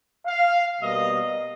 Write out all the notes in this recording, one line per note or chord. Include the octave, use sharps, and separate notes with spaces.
F5
B2 G3 A#3 D#5